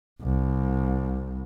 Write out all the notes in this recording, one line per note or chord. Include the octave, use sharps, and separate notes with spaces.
C2